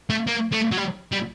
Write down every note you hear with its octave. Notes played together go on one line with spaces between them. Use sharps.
A3
A#3
A3
F#3
G3
G3